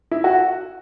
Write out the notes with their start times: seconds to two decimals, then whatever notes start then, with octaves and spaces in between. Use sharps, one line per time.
0.11 E4
0.24 F#4